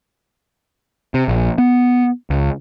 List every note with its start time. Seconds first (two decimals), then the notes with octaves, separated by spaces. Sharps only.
1.14 C3
1.28 A#1
1.58 B3
2.30 C#2